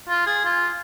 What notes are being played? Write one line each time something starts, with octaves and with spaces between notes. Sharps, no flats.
F4
G#4
F4